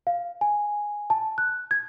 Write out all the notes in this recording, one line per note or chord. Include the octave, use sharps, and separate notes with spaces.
F5
G#5
A5
F#6
G#6